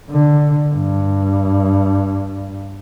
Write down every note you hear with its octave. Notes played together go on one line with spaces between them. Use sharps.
D3
G2